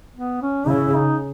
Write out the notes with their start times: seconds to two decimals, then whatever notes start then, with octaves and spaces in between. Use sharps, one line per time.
0.16 B3
0.42 C#4
0.68 C#3 E4
0.95 D#4